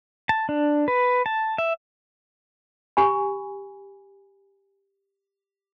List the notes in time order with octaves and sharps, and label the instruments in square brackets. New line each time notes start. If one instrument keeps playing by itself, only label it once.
[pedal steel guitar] A5
D4
B4
A5
E5
[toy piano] G4 G#5 B5